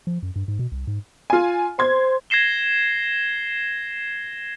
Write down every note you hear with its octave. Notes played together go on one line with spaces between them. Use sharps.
F3
F#2
G2
G#2
B2
C2
G#2
F4 G#5
C5 C6 G#6
G#6 A#6 C7 E7 G7